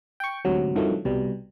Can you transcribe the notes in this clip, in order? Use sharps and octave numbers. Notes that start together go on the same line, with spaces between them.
G5 C#6
D2 G#2 C3 F#3
G2 C3 D#3 F3 F#3 A3
C2 B2 G3